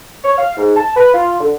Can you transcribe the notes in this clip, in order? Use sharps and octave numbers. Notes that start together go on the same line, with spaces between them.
C#5
F5
G#2
A5
B4
F4
D3